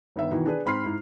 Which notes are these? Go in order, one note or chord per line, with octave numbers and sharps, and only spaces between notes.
G1 D#3 B3 E5
B2 D#3 E3 B3 E4
D4 G#4 B4
G#2 C4 B5 C6 F6 C7
G#2 E4